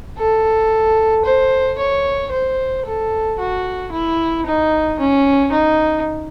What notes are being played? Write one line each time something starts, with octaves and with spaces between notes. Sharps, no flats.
A4
C5
C#5
C5
A4
F#4
E4
D#4
C#4
D#4